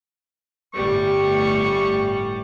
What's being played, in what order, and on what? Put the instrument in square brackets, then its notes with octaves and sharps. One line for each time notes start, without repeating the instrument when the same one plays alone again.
[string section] G1 A2 G3 [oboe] C#6